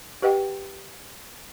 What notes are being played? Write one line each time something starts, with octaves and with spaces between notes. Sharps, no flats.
G4 B4 D#5 F#5 G5